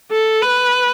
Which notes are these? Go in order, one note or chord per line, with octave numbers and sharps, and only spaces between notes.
A4
B4